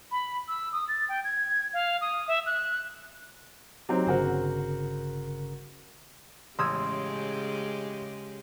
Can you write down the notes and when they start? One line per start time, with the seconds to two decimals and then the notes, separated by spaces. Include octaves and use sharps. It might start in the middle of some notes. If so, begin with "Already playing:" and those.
0.11 B5
0.48 E6
0.73 D#6
0.88 A6
1.09 G5
1.24 G#6
1.73 F5
2.01 D#6
2.28 E5
2.46 F#6
3.89 F#3 C4 D#4 G4
4.06 G1 C#3 F#4 A#4 C5
6.59 A1 C#3 G#3 G4 C6 D#6 E6 G#6